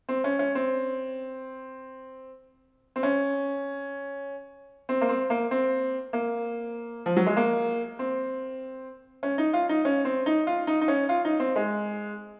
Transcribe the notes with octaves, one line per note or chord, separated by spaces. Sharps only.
C4
C#4
C#4
C4
C4
C#4
C4
A#3
C4
A#3
C4
A#3
F3
F#3
G#3
A#3
C4
C#4
D#4
F4
D#4
C#4
C4
D#4
F4
D#4
D#4
C#4
F4
D#4
C4
G#3